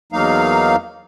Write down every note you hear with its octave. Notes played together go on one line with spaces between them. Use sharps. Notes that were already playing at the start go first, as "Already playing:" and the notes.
E2 F#3 A#3 D#4 F5